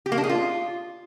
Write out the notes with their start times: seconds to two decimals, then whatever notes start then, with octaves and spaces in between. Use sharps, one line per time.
0.06 G4
0.12 A#3
0.18 D4
0.24 G#4
0.29 F4